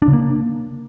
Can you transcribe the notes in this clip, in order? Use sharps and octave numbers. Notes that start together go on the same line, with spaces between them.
D4
C#3
A#3